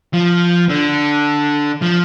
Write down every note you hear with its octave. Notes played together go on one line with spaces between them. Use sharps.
F3
D3
F3